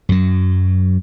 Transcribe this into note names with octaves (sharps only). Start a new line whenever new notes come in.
F#2 F#3